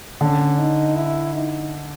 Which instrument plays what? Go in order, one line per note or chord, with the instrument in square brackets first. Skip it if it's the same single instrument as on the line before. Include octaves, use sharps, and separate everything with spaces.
[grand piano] D3 [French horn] C#4
[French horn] D#4
E4
D#4